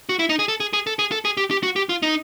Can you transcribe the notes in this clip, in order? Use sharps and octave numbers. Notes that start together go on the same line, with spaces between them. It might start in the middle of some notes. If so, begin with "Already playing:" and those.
F#4
E4
D#4
G#4
A4
G#4
G#4
A4
G#4
A4
G#4
G4
G4
F#4
G4
F4
D#4